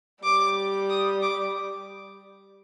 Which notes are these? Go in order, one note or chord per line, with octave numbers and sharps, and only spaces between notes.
G3 D6
D#6
D6